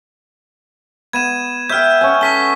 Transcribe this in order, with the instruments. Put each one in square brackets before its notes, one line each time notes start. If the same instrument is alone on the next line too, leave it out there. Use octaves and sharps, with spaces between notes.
[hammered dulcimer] B3 [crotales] G#6 D#7 E7
[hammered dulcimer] E5 G5 [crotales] F6 G6
[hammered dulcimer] C#4 F#5 G#5
[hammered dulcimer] A4 [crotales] C#6 B6 G7